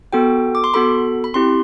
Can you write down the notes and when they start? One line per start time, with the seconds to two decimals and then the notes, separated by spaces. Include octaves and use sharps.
0.13 B3 F#4 A4 G5
0.55 D6
0.64 C6
0.74 B3 F#4 A4 B5
1.24 B5
1.34 C4 E4 G4 C6